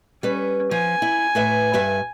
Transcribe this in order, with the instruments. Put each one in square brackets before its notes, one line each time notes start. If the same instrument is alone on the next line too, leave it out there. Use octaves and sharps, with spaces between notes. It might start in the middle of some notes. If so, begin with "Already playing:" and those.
[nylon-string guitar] G3 B4 [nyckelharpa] C#4
[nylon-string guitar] F3 [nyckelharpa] G#5
[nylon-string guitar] E4
A2 B4 E5
G2 B4 E5